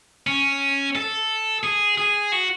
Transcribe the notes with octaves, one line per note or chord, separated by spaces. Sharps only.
C#4
A4
G#4
G#4
F#4